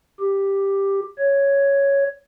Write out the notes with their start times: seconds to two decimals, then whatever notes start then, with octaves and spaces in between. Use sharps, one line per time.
0.20 G4
1.18 C#5